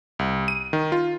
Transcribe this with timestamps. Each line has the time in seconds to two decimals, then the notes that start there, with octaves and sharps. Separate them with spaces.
0.19 C2
0.48 D#7
0.73 D#3
0.92 F4